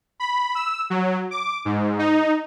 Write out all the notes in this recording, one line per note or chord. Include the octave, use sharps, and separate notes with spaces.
B5
E6
F#3
D6
G#2
D#4